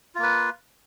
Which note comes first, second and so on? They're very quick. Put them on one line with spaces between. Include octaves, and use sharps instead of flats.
F4 A#3 B4